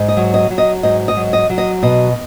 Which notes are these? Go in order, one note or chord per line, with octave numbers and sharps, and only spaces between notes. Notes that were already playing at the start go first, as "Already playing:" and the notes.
Already playing: G#2
D#5
F#3
D#5
F#3
D#5
G#2 D#5
D#5
F#3
D#5
F#3
D#5
B2 D#5